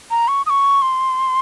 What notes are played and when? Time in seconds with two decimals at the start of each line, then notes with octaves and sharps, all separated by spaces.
0.11 A#5
0.28 C#6
0.46 D#6
0.50 C#6
0.82 C6